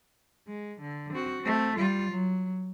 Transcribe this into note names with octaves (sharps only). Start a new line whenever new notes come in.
G#3
D3
C4 F#4
A3 C4
G3 F4
F#3